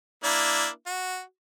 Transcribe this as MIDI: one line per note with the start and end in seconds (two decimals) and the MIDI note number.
0.24 0.67 58
0.24 0.67 62
0.24 0.67 64
0.86 1.21 66